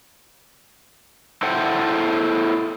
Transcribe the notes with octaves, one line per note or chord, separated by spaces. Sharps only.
E4 A4 C5 F#5 G5